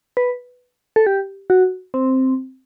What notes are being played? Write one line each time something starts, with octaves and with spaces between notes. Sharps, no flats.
B4
A4
G4
F#4
C4